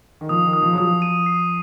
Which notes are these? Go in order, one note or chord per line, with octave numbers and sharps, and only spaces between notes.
D#3
F3 D#6
D#3
D#6
F3
F#3
F3 D#6
D#7
C7